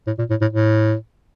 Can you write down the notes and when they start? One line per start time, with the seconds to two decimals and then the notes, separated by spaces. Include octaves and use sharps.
0.07 A2
0.19 A#2
0.30 A2
0.41 A2
0.53 A2